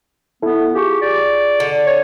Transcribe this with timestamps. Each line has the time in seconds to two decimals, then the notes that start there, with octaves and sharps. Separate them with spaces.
0.42 B3 E4 A4
0.74 F4 G4 G#4 C#6
1.02 D5
1.60 D3
1.86 C#5